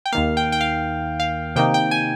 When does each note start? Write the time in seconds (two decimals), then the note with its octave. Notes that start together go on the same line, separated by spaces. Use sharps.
0.06 G5
0.12 D#2 D#3 A#3 F5
0.37 G5
0.52 G5
0.61 F5
1.20 F5
1.56 C3 D#3 A#3 D#4 G5
1.74 G5
1.91 G#5